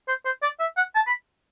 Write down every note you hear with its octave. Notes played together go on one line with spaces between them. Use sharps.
C5
C5
D5
E5
F#5
A5
B5